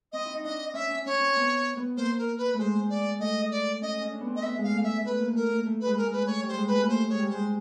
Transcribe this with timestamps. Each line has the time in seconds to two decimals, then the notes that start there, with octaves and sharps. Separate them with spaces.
0.12 C4 D#5
0.25 E4
0.34 D#4
0.44 D4 D#5
0.74 C#4 E5
0.90 C#4
1.06 C#4 C#5
1.20 C4
1.36 B3
1.77 B3
1.97 A#3 C5
2.18 A#4
2.37 B4
2.54 A3
2.59 G#3 C5
2.89 D5
3.20 A3 D#5
3.51 D5
3.81 C#4 D#5
4.01 C#4
4.12 D4
4.21 B3
4.27 C4
4.35 D#5
4.42 B3 E5
4.58 G#3 F5
4.73 A3
4.84 E5
5.04 A3 B4
5.20 A#3
5.35 A3 A#4
5.51 A#3
5.66 A3
5.80 B4
5.86 G#3
5.97 A#4
6.06 G#3
6.12 B4
6.26 A3 C#5
6.43 G3 C5
6.57 G#3
6.67 B4
6.72 A3
6.81 A#3
6.89 A3 C5
7.09 G#3 C#5
7.19 G3
7.30 G#3 C5